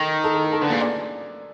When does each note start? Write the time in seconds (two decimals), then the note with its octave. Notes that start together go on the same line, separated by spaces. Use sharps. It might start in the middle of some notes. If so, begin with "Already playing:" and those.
Already playing: D#3 A4
0.24 A4
0.34 A4
0.43 A#4
0.52 A4
0.61 D3 B4
0.70 A#2 G#4
0.80 D5